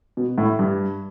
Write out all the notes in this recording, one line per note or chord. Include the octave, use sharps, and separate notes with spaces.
B2
A2
G2